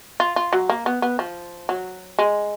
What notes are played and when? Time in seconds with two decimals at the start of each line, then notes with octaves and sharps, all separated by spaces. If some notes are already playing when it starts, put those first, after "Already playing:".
0.20 F4
0.36 F4
0.53 F#3
0.70 A#3
0.86 B3
1.02 B3
1.19 F3
1.69 F#3
2.19 G#3